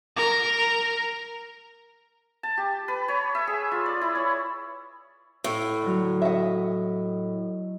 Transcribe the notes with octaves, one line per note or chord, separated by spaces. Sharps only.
A#4
A5
G4
B4
C#5
E5
G#4
F4
D5
E4
C#5
A2
D3 F#3
D#5 E5 F#5